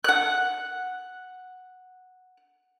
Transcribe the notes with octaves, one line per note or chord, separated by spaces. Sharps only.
F#5 F#6